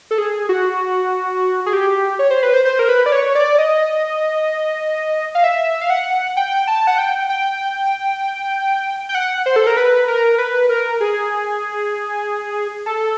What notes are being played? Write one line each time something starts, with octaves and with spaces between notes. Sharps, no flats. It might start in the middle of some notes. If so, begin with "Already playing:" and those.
A4
G#4
F#4
G#4
G4
C#5
C5
B4
C5
C5
A#4
B4
D5
C#5
D5
D#5
F5
E5
F5
F#5
G5
A5
F#5
G5
G5
G5
F#5
C5
A4
A#4
B4
A#4
B4
A#4
G#4
A4